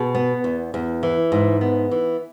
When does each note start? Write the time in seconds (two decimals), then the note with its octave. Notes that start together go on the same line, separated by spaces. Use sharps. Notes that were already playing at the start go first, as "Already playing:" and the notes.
Already playing: B2 G#4 B4
0.15 B3
0.44 E2
0.74 E2
1.03 E3
1.32 G#2
1.61 B3
1.91 E3